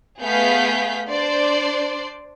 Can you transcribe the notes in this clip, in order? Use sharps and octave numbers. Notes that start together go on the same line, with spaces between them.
A3 B3 G#4 F5 G6 B6
D4 C5 D5 C6